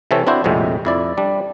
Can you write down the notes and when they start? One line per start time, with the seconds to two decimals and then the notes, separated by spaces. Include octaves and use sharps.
0.11 C3 E3 C4 A4 C#5
0.27 C4 D4 E4 F#4 C5
0.44 A#1 F2 A2 C3 G#3
0.85 F2 E4 D5
1.17 G3 D4